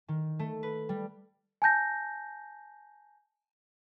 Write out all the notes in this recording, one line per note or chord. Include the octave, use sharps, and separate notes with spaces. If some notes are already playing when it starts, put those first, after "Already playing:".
D#3
A3
B4
G3
G#5 A5 G6 A#6